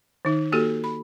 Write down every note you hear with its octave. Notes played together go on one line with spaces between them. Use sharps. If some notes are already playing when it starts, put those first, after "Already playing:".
D#3 D#4
A#3 F#4 G4 A4
B5